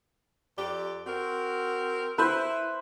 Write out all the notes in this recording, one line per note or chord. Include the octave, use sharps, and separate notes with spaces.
F2 G4 D5
C4 F#4 A#4
E4 B4 C5